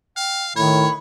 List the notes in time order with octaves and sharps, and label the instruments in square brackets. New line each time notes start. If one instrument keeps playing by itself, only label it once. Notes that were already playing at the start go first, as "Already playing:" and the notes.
[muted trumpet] F5 [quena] G5
[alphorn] A2 [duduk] D#3 [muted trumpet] C#5 [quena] B5